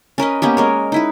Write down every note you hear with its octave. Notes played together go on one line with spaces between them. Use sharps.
C#4 A#4 B4 D#5
A#3 B3 C#4 G4
G#3 A#4 C#5
D#4 E4 B4